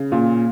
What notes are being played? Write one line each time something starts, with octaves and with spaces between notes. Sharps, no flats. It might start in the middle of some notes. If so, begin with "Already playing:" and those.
Already playing: C#3
A#2